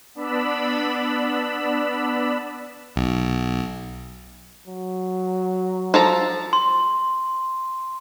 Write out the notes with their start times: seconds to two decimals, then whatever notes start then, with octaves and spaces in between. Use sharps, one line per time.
0.15 B3 D4 D5 B5 E6
2.96 B1
4.67 F#3
5.94 F3 A4 A#5
6.53 C6